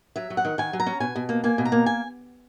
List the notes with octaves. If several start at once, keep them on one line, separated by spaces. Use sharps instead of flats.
F#3 E5
F#3
F#5
D#3
D#3 G#5
F#3
A#5
C#4
B2 G#5
B2
A#3
A#3 G#5
B2
A#5
A#3
G#5